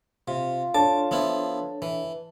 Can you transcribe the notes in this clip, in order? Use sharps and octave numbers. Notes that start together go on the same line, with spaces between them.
C3 F4
D4 A4 C#5 A5 D6
F3 B3 E4
E3